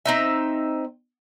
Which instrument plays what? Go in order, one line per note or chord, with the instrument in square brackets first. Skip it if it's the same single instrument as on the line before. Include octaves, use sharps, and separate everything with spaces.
[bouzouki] C4 D#4 E5